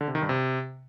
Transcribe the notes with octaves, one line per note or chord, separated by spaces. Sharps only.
D3
C3
D#3
G2
C3